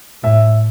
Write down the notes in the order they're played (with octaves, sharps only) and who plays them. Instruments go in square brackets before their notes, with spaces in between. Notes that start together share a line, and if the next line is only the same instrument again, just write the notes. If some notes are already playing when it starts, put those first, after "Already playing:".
[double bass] A2 [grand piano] E5